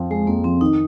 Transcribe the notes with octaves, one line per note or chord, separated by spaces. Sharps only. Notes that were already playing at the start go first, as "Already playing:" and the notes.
Already playing: F2 F3 C4
G#3 G#4
F2 A#3
F3 C4
D#3 D#4